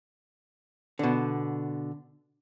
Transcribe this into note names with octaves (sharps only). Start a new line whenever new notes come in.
B2 D3